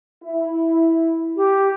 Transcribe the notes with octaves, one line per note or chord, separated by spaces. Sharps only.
E4
G4